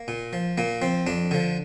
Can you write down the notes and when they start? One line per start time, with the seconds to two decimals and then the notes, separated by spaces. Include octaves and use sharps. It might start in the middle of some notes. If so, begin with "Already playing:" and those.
Already playing: A#3
0.08 A#2
0.33 F3
0.58 A#2 A#3
0.82 F3 C4
1.07 F2 D4
1.31 D3 F3